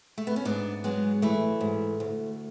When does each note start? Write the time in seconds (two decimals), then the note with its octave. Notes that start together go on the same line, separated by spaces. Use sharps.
0.18 A3
0.27 B3
0.36 C#4
0.45 G#2 B3 D4
0.84 F#3 G#3 B3
1.22 E3 A3
1.61 G#2
2.00 D2